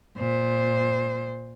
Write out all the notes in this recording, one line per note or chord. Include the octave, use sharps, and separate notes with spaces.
A#2 C5